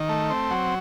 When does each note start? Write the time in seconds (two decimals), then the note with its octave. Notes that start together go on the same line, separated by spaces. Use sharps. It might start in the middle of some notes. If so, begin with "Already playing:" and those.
Already playing: D#3
0.09 A3
0.30 C4
0.51 F#3